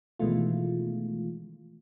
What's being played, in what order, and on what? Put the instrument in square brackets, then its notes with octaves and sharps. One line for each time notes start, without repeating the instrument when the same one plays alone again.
[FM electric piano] B2 D#3 E3 G#3 A3 F4